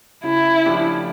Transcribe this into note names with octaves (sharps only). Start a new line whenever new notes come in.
C#3 E4
F3 A3 D4 G4